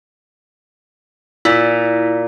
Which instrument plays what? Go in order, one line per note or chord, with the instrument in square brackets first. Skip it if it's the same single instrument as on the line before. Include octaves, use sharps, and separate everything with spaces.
[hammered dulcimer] A#2 [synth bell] E4